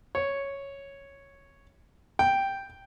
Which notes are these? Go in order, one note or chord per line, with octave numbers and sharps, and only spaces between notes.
C#5
G5